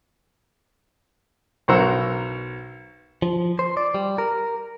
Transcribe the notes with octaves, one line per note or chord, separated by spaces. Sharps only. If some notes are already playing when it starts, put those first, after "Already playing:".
B1 A#4 C5 F#5 A#5 E6
F3
C5
D5
G3
A#4